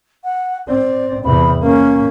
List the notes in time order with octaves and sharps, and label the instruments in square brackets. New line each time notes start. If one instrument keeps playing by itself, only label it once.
[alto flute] F#5
[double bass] C4 [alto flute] D5
[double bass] E2 C3 [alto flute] B5
[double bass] A#3 [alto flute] C#4